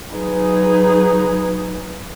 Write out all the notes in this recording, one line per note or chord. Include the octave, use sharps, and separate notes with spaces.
F#3 D#4 G#4 B4